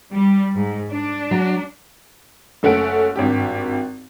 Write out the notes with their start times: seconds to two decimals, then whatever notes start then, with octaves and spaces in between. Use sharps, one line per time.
0.12 G3
0.55 G#2
0.90 D4
1.31 F#3
2.63 F#1 A3 C#4 F#5 D7
3.16 G#1 G2 G4